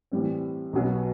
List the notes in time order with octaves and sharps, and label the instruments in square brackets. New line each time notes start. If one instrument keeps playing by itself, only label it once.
[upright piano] A2 E3 G3 C4
B1 B2 F#3 B3